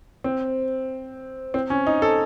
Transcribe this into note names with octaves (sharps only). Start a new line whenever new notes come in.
C4
C4
C#4
D#4
A4